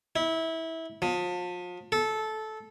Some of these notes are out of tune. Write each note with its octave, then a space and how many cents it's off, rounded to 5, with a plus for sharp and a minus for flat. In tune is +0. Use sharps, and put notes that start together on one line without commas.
E4 -20
F3 +35
A4 -15